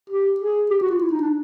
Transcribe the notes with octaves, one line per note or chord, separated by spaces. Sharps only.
G4
G#4
G4
F#4
F4
E4
D#4
D4